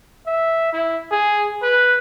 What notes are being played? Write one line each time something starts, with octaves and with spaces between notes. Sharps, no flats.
E5
E4
G#4
B4